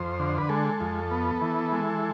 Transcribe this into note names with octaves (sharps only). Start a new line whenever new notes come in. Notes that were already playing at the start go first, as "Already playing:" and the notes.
Already playing: F2 C5
D3
B4
G#3 A4
F2
B3
E3
G#3